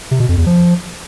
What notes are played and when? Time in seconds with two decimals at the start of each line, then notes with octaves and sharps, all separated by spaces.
0.11 C3
0.20 B2
0.29 F2
0.38 E2
0.46 F3